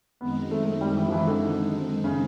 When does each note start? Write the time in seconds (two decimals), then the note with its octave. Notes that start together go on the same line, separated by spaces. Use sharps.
0.20 F#2 D#3 G#3 B3 C4 D#4
0.51 A3
0.66 A3
0.81 G3
0.97 E3
1.08 F3
1.12 E3
1.27 D3
2.04 C#3